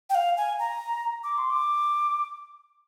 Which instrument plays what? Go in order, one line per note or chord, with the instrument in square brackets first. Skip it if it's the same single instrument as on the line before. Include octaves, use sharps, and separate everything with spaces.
[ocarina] G5
F5
G#5
A#5
D6
C6
D6